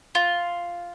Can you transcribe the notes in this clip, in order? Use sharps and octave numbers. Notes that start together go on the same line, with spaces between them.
F4